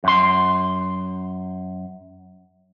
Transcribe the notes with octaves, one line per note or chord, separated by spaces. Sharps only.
F#2 C6